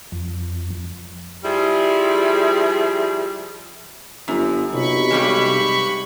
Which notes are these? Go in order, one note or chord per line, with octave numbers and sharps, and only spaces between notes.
F2
F3 G3 E4 G#4
G1 F#2
B1 C3 B5 C#6
G2 G3 G#3